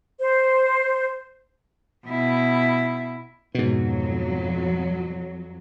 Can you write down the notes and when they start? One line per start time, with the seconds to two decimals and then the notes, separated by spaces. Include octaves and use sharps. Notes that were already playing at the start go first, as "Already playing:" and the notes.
0.20 C5
2.07 B2 E4
3.55 F2 G#2 B2 F#3